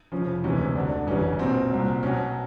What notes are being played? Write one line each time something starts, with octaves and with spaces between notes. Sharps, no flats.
F1 F2 C#3 F3 C#4
E1 D2 C3 E3 C#4
D2 D3 F#3 D4
G1 F#2 C#3 E3 G3 C#4
B1 A#2 F#3 C4
C2 A#2 F#3
B1 B2 F#3 C#4